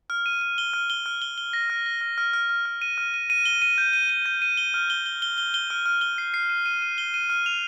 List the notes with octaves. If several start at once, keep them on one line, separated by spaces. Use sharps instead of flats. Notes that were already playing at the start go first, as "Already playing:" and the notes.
F6
D#7
D#7
G7
F6
G7
F6
G7
G7
A#6
F6
A#6
F6
F6
F6
F6
F6
D#7
F6
D#7
D#7
G7
D#7
G6
D#7
D#7
G6
D#7
G7
F6
G7
G7
G7
G7
G7
F6
F6
G7
C7
C7
D#7
D#7
D#7
G7
D#7
F6
F7